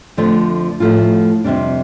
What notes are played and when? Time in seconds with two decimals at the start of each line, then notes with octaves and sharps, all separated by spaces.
0.17 F2 D3 F3 A3 D4
0.80 A2 F3 A3 F4
1.44 F2 C3 G3 D4